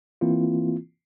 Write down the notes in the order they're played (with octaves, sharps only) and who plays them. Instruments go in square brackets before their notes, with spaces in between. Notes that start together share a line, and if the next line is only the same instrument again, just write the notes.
[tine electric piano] E3 A#3 C4 E4 F4